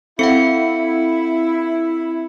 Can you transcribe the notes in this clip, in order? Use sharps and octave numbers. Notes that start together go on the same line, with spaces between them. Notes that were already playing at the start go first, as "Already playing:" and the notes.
C4 E4 A4 F5 F#5 C#7